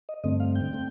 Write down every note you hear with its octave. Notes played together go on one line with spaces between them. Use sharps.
D#5
G2 D3 A3 C4 D#5
F5
G5
D3 A3 C4